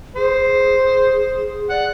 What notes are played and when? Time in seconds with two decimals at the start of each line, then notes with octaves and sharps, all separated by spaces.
0.16 G#4 C5
1.70 D5 F#5